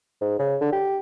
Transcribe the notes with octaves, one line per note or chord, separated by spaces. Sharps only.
G#2
C#3
D3
G4